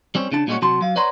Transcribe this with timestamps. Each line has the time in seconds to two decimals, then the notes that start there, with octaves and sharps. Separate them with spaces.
0.15 G3 C4 C#4
0.32 C#3 D4 A5
0.47 A#2 G3 G#3 C4 C#4 F#4
0.62 C3 F#3 F#4 A5 C6
0.81 F#3 F5
0.96 B4 C#5 D5 F#5 A#5 C6